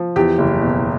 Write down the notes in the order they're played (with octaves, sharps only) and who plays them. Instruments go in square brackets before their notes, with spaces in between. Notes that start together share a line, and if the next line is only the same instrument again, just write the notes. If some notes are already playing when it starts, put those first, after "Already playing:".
Already playing: [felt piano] F3
E2 G4
F#1
B2